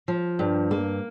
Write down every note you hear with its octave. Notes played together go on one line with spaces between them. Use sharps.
F3
G2
A#3